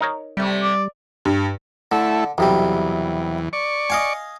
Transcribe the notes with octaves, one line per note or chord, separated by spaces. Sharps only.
D#4 A#4 C#5
C3 G3 A3
D5
G2
D3 A3 E4
B1 E2 C3 G3
D5 C#6
D#5 F5 G#5